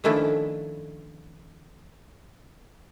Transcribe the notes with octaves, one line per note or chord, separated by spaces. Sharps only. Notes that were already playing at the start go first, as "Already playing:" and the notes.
D#3 F3 A3 C#4 D4 E4